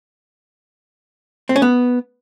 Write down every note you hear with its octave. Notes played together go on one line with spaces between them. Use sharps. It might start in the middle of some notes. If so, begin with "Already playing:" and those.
C4
C#4
B3